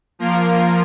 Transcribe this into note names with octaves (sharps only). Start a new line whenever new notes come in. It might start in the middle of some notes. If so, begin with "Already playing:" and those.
F3 A#3 F4 A#4